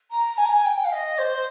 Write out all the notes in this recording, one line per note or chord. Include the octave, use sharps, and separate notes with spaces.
A#5
G#5
A#5
G#5
G5
G5
F5
D#5
C5